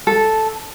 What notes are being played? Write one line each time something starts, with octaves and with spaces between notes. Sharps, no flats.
A4